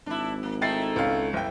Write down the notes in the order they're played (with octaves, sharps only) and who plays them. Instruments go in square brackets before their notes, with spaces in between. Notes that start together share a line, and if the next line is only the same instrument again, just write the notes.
[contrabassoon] G#1 [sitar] D4 E4
[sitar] A#3
[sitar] A3 D#4 E4 [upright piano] G5 A6 C7
[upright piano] C#2 C#4 F5
G1 E4 G5